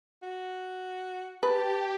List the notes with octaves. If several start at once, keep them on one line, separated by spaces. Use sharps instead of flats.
F#4
G4 B4 A5